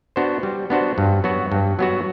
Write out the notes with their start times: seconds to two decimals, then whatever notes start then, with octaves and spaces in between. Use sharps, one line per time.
0.16 B3 D4 F#4 C5
0.43 G3
0.70 B3 D4 F#4 C5
0.98 G2
1.24 F#3 B3 F#4
1.52 G2
1.79 F#3 B3 F#4